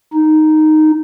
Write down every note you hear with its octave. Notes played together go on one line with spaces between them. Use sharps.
D#4